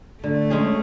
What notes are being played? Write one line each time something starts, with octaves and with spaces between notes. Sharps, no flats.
D3 A3
G#3 C#4 G#4